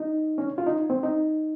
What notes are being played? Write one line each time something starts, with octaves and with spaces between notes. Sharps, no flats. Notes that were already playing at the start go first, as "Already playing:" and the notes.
Already playing: D#4
C#4
F4
D#4
C4
D#4